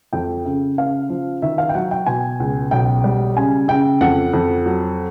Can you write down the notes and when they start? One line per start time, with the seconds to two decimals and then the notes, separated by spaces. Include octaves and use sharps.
0.13 F2 G5
0.45 C#3
0.77 C#3 F5
1.10 F3
1.42 D#3 E5
1.58 F5
1.69 G5
1.75 F#3 F#5
1.91 G5
2.06 B2 G#5
2.40 C#2
2.71 B1 G5
3.04 G3
3.36 C#3 G#5
3.68 C#3 G5
4.01 F2 F#5
4.33 F2
4.66 F#3